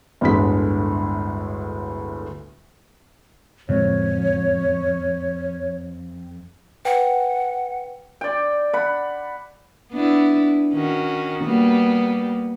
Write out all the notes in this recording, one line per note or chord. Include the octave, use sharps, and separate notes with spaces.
G1 D2 A2 D3 G#3 B6
F2 A2 D3 G#3 C#5
B4 F#5 G5
D5 G5
F#5 B5
B3 D4 E4
D#3 C#4 F#4
G3 A#3 B3